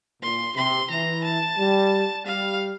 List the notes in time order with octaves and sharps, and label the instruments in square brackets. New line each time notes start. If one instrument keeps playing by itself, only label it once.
[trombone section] A#2 [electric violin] C6
[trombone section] C3 [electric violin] C6
[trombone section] E3 [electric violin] A#5
[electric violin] A5
[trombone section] G3
[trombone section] G3 [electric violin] F5